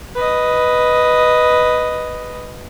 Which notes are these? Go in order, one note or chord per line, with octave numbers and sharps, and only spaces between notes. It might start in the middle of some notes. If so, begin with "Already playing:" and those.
B4 D#5